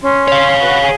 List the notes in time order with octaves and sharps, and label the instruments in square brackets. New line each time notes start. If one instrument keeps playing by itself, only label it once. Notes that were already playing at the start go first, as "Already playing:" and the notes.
[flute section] C#4 C6
[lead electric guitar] C#5 F5
[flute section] F#4 B4
G#4